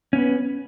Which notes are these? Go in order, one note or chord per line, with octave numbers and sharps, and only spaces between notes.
B3 C#4 B4